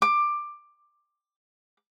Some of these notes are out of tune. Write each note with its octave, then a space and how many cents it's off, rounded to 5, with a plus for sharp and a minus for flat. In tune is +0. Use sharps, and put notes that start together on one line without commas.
D6 +15